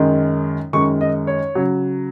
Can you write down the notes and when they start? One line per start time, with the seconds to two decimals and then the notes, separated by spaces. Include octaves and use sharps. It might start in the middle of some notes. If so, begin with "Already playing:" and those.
Already playing: F#2 D#3 G#3
0.73 F#2 D#3 G#3 C#6
1.01 D#5
1.27 C#5
1.55 C#3 F#3